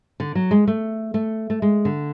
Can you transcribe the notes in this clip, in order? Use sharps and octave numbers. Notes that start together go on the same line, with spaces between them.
D3
F#3
G#3
A3
A3
A3
G#3
D3